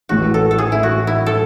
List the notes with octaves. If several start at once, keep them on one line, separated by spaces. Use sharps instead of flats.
A1 A2 E3 G#3 F#4
A4
A4
G#4
E4
F#4
E4
A4